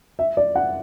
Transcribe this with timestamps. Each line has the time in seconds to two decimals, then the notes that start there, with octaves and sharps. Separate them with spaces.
0.19 E5
0.37 D5
0.56 F#5